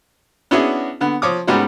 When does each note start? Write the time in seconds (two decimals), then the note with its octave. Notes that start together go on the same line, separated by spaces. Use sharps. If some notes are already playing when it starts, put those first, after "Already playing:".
0.51 B3 C#4 D4 E4 F#4 G#4
1.01 D3 B3
1.22 F3 C#5 D6 D#6
1.47 G#2 G3 G#3 B3 C#4 F#4